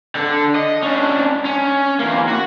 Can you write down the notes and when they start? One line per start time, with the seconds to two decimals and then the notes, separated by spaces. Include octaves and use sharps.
0.15 D3 A4
0.55 D#5
0.83 C#4 D4
1.45 C#4
2.00 E2 A#3
2.28 F#4